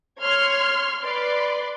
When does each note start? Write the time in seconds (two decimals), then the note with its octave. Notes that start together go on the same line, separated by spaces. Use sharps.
0.21 C#5 C6 F6 G#6
1.00 B4 D5 C6